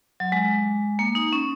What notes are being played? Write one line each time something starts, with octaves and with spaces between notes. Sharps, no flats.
F#3
G#3
A#3
D#4
C#4